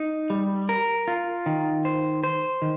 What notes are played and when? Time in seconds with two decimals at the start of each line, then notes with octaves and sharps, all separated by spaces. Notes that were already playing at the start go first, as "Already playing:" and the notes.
Already playing: D#4
0.30 G3
0.69 A#4
1.08 F4
1.46 D#3
1.85 C5
2.24 C5
2.62 D#3